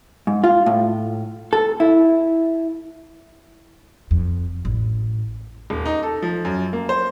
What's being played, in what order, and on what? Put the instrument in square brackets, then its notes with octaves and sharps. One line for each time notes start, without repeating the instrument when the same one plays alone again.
[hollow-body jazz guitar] G#2
F4
A2
A4
E4
[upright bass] F2
A1
[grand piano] D#1
D#4
A4
F3
F#2
A#3
C5